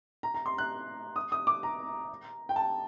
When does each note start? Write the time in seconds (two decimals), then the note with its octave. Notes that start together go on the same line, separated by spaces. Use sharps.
0.23 A#5
0.34 A#5
0.46 C6
0.58 F#6
1.16 D#6
1.32 D#6
1.47 D6
1.63 A#5
2.49 G5
2.56 A5